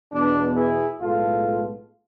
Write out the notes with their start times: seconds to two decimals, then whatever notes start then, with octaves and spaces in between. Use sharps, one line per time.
0.12 E2 B2 B3 D4
0.56 E4 G#4
1.00 B1 A2 G#3 B3 F4 A4